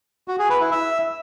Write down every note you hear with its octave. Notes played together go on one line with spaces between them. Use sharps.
F#4
G#4
B4
E4
E5